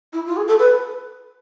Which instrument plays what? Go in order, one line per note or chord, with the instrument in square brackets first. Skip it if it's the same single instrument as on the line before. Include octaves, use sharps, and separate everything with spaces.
[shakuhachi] E4
F4
G#4
A4
B4